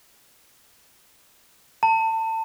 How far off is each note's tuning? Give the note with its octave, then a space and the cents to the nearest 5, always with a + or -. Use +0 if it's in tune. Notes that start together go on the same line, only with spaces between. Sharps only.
A5 +30